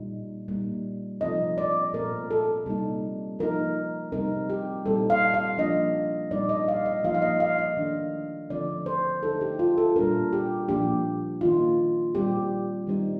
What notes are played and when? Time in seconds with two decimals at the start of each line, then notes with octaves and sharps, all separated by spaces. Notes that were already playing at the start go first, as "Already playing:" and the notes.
Already playing: A#2 G3 A#3 D#4
0.48 A#2 G3 A#3 D#4
1.21 C3 F3 A3 C4 D#4 D#5
1.58 D5
1.93 A#2 A3 C4 A#4
2.31 A4
2.66 C3 G3 A#3 D#4
3.39 F3 A#3 D#4 A#4
4.12 C3 G3 C4 D#4 A#4
4.50 G4
4.86 A#2 G3 C4 D#4 A4
5.10 F5
5.34 F5
5.58 F3 A#3 D4 D#5
6.31 A#2 G3 C4 D#4 D5
6.49 D#5
6.68 F5
6.85 D#5
7.04 F3 A#3 D#4 F5
7.14 F5
7.22 D#5
7.40 F5
7.59 D#5
7.77 D#3 A3 D4
8.50 D3 F3 A3 C4 D5
8.86 C5
9.23 D3 A3 D#4 A4
9.41 G4
9.59 F4
9.78 A4
9.96 A#2 G3 D4 A#4
10.33 G4
10.68 A#2 F3 A#3 D4 G4
11.41 D#3 A#3 D#4 F4
12.15 A#2 G3 C4 G4
12.87 D#3 G3 C4 D#4